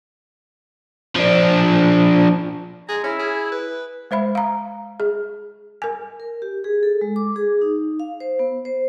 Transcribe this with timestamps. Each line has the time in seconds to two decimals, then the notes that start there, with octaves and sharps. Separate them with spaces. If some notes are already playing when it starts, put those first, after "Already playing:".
1.16 F3 D4
2.89 G#3 G#4 A#5
3.04 C#4 E4
3.19 G#4
3.52 B4
4.11 G#3 C5 E5 B5
4.35 F5 A#5
5.00 G#4
5.82 A#4 G#5
6.20 A#4
6.42 G4
6.64 G#4
6.83 A4
7.01 G#3
7.16 D6
7.36 G#4
7.61 D#4
8.00 F5
8.20 C5
8.39 B3
8.65 C5